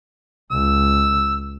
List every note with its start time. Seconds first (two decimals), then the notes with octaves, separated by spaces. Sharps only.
0.51 C#2 E6